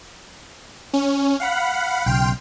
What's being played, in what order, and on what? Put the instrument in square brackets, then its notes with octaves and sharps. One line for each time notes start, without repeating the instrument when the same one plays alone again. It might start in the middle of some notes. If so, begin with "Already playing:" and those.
[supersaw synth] C#4
F5 F#5 B5
[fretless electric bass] B1 C#3 [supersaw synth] G5 C6 F6